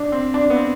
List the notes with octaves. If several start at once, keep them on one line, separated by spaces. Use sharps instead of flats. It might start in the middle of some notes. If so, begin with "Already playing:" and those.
Already playing: D4
C4
D4
B3
C4